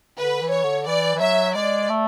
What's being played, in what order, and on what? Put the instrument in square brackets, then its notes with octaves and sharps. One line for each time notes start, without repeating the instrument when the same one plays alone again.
[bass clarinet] D3 [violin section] B4
[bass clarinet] E3
[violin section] C#5
[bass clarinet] D3
[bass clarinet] E3 [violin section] D5
[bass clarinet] E3
[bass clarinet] F#3 [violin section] E5
[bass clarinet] G#3 [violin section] D5
[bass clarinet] A3